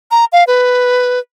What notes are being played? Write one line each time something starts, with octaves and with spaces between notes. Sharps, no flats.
A#5
F5
B4